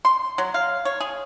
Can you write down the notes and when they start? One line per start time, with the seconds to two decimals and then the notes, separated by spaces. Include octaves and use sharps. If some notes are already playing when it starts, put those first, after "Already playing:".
0.05 C6
0.38 F#3
0.54 F5
0.85 C#5
1.00 G#4